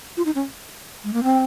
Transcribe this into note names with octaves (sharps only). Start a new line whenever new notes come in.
F4
D#4
C#4
G#3
A#3
C4